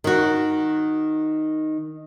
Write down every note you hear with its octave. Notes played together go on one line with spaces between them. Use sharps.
D#3 F#4